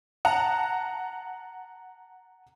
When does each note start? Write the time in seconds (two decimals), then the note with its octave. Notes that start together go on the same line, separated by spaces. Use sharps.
0.25 F#5 A5 A#5